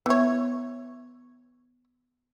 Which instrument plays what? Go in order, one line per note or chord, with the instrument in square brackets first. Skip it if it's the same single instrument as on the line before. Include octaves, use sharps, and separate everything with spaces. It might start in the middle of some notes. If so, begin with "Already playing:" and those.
[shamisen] E3 C#5 [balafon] B3 E5